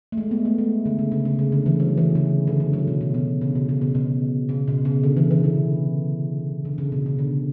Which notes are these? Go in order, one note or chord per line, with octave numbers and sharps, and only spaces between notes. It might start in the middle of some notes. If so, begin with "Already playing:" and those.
A3
G#3
B3
A3
G#3
D3
C#3
C#3
C#3
C#3
D3
E3
F#3
E3
C#3
D3
D3
F#3
B2
B2
B2
C#3
B2
C#3
B2
B2
C#3
B2
C#3
D3
E3
E3
D3
D3
C#3
B2
C#3
D3